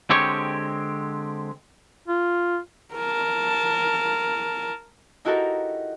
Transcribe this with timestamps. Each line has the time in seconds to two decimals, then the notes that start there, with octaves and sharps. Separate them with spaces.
0.10 D3 G#3 C4 G4 C#5
2.08 F4
2.95 A#4 A5
5.25 D#4 E4 F#4 G4 A4 A#4